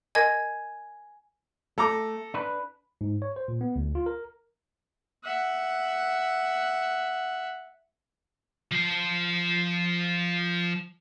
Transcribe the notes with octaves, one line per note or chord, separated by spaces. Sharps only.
A#4 D#5 G#5 G#6
A3 A4 A#5 D6
D4 B4
G#2
C#5
C5
A#2
B3
D2
F4
A#4
E5 F#5
F3 C5